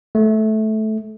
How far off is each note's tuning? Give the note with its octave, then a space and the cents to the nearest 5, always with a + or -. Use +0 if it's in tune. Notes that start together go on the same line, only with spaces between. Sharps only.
A3 -15